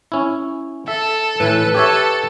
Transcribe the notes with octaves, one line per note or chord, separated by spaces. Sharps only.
C#4 E4
A4 E5
A2 E3 B4
G4 A4 C#5 E5